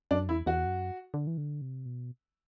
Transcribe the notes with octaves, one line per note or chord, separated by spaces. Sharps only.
F#2 D4
E2 E4
E2 F#4
F#2
D3
E3
D3
C3
B2